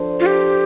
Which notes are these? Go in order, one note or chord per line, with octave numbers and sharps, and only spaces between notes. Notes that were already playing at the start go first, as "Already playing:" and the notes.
Already playing: F3 D4 A4 C5
F4
G4